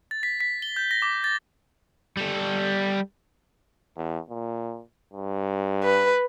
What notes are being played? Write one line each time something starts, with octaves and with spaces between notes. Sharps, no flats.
A6
B6
B6
G7
G6
A#6
D6
A6
G3 A4
E2
A#2
G2
B4